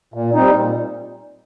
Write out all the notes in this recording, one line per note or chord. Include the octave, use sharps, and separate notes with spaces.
A#2
G3 C4 D#4
A#2